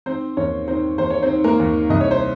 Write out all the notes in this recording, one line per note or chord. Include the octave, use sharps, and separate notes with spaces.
D#3 C4 C5
D#2 C#4 C#5
D#3 C4 C5
D#2 C5
C#5
C4 C5
D#3
A#3 A#4
D#2
C2 D#5
C#5
C5